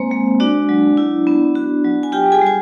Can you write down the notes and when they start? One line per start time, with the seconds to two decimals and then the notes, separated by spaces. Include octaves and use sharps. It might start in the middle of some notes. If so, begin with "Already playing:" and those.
Already playing: G#3 A#3 C4 C5
0.11 G#3
0.40 D4 F#4 D5
0.69 F#3
0.97 E4
1.27 B3
1.55 F#4
1.84 F#3
2.03 G#5
2.12 F4 G4 G5
2.32 G#4 G#5
2.41 G3
2.47 G#5